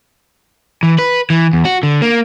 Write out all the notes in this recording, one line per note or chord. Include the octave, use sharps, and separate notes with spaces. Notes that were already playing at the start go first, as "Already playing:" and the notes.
E3
B4
E3
E2
F#4
D3
A#3